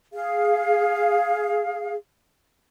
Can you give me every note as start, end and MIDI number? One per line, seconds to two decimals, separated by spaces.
0.12 1.95 68
0.12 1.95 77